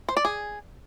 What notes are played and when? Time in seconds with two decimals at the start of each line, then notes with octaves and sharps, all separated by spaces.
0.09 C5
0.17 D5
0.25 G#4